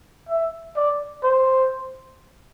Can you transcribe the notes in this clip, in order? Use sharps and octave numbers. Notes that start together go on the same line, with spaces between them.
E5
D5
C5